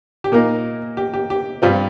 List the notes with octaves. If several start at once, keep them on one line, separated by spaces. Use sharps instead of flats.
G4
A#2 A#3 D#4 A#4
G4
G4
G4
G2 G3 C4 F4